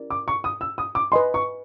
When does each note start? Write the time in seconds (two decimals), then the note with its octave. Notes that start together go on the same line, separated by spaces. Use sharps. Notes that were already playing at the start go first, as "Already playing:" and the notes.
Already playing: C#4 E4 G4 A#4 D5
0.10 D6
0.28 C#6
0.44 D#6
0.61 E6
0.78 D#6
0.95 D6
1.12 B4 D#5 G#5 C6
1.34 C#6